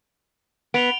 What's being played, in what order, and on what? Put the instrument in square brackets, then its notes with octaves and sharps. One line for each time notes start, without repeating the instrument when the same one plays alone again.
[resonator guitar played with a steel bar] B3 [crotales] D7 F7 G7